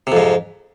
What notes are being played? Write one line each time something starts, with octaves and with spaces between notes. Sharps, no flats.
F2 G#2 C3